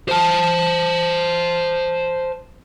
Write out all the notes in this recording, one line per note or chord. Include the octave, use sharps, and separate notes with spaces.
C5 A5